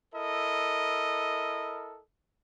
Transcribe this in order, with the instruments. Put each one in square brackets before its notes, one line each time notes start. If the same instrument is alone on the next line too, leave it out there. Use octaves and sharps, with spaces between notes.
[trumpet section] E4 A4 A#4 D#5